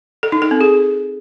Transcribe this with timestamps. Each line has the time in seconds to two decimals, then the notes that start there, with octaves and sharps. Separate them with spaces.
0.23 A4
0.32 D#4
0.42 A4
0.51 C4
0.61 G#4